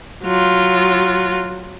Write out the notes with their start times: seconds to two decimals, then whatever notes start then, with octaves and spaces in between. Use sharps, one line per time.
0.24 F#3 F4